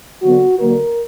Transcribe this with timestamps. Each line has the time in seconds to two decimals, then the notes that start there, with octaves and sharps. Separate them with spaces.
0.22 D3 F#3 B3 F#4
0.59 D3 F#3 A#3 A#4